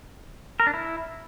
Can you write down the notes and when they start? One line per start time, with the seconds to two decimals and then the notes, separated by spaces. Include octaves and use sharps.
0.60 A#4
0.67 D4
0.74 E4